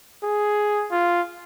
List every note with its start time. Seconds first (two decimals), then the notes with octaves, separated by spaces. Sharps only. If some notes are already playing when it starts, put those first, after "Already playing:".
0.23 G#4
0.91 F4